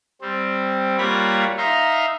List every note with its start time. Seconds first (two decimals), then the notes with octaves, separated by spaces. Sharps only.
0.22 G3 C4
0.98 G3 A#3 F4 C#5 F#5 B5
1.58 D#4 E5 F5 A#5 C6